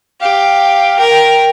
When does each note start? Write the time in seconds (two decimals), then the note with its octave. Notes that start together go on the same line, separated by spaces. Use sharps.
0.21 G4 F5
0.99 A#4 G5